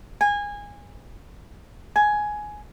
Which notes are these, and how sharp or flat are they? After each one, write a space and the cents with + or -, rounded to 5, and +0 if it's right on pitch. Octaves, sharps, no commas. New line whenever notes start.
G#5 -20
G#5 +10